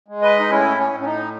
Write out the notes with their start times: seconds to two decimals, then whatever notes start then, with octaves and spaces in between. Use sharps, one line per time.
0.08 G#3
0.22 B4 D#5
0.40 D#4
0.49 A2 C#4 E4
0.77 C#4
0.92 A2
1.00 C#4
1.05 D#4